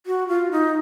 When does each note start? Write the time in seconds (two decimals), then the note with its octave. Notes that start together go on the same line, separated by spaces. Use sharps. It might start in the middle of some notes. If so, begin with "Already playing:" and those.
0.06 F#4
0.29 F4
0.52 D#4